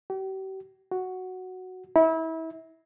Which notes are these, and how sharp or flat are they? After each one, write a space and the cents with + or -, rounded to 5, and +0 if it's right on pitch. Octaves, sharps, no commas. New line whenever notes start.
G4 -40
F#4 +0
E4 -30